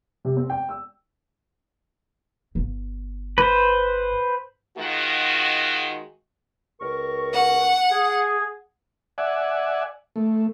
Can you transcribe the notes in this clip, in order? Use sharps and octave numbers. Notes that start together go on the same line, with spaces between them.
C3
C4
G5
E6
G1
B4 C5
D#3 G#3 F4 F#4
C#2 A#4 C#6
F#5
G#4
D5 E5 F#5 G#5
A3